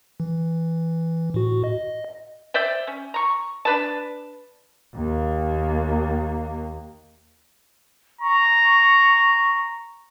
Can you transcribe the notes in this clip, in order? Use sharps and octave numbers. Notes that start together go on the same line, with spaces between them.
E3
A2 F#4
D#5
C5 D5 E5 G5
C#4
A#5 C#6
D4 B4 A5
D#2 A#3
A#5 C#6